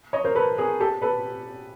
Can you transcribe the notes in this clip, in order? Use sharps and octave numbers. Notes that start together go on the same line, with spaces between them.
C#5 D#5
A#4 C5
A4 B4
G#4 A#4
G4 A4
A4 B4